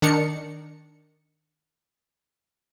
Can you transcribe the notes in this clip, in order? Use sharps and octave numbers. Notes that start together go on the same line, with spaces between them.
D#3 D4 A#4 C#7